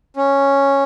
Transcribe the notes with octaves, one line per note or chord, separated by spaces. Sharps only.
C#4